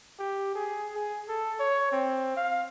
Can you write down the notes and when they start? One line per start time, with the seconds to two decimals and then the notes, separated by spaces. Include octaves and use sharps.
0.19 G4
0.55 G#4
0.95 G#4
1.29 A4
1.60 C#5
1.92 C4
2.37 F5